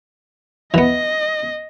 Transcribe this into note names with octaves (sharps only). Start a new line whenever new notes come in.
E3 B3 D#5